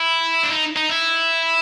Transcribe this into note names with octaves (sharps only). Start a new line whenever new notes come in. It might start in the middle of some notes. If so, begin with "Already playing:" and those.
Already playing: E4
D4
D#4
D#4
E4